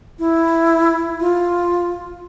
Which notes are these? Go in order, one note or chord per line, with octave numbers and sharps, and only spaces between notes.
E4
F4